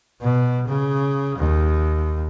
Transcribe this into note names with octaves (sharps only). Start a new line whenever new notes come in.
B2
C#3
D#2